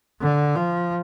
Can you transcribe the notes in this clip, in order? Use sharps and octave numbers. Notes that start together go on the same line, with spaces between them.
D3
F3